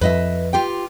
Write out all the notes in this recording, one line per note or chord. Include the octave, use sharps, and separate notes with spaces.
F2 B4 D#5 E5
F4 G4 G5